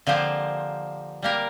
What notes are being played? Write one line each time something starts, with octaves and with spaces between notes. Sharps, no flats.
D3 F3 A#3 G4 C5
G3 A#3 G4 A#4